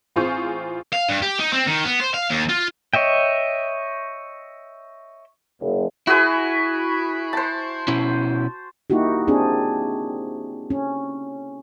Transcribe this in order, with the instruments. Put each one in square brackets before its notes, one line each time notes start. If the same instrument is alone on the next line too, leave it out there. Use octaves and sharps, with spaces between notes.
[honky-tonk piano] A1 C4 F4 G#4 C5 C#6
[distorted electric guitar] F5
G2
G4
D#4
C4
D#3
B3
C5
F5
D#2
F4
[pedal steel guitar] C#5 D#5 E5 G5
[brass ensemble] F#1
[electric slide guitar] E4 [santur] F#4 G#4 B4
[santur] C5 A5
[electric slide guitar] B2 C#4 E4
[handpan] A#3 D#4 E4 F#4 G4
C4 D4 G#4
C#4